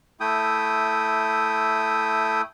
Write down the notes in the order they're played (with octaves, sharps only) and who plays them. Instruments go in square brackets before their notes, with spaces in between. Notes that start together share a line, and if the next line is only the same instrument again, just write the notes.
[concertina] A3 E4 G5 D#6